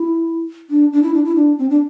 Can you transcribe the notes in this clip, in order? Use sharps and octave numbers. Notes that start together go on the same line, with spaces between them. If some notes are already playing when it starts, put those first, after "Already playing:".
Already playing: E4
D4
D4
E4
D4
E4
D4
C4
D4